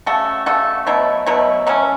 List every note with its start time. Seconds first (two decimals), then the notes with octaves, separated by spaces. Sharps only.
0.06 C#3 A3 F#4 A4
0.46 C#3 A3 F#4 A4
0.87 B2 F#3 A3 E4
1.26 B2 F#3 A3 E4
1.67 F#3 A3 C#4